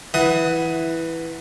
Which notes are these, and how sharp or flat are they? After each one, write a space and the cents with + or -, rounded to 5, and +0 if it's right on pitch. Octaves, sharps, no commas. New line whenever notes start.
E3 +0 F#5 +0 D#6 +20